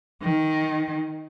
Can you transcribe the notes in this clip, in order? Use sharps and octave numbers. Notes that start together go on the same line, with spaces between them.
D#3